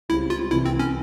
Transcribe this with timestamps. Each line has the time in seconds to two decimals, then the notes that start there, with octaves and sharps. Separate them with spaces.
0.09 C#2 C#3 G3 C4 E4
0.30 F4
0.51 C2 C3 E3 E4
0.65 C4
0.80 C#4